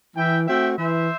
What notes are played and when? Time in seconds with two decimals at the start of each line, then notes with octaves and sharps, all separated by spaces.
0.16 E3 E5 G5
0.46 A3 C4 F#4 E5 G5
0.78 E3 C5 E5